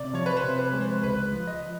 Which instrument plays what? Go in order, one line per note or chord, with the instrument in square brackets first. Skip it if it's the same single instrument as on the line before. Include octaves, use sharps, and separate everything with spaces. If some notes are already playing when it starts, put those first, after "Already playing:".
Already playing: [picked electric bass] C3 [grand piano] D5
[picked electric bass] F3 [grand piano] C#5
[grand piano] B4
C5
[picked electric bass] C3
[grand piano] B4
[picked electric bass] G#3
[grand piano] C5
[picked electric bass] C#2 [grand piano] B4
[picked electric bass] F3
[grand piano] D#5